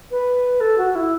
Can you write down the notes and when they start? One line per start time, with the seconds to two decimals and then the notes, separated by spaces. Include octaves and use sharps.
0.11 B4
0.60 A4
0.78 F#4
0.95 E4